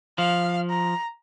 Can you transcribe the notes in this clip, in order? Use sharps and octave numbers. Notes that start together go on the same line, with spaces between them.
F3 F5
A#5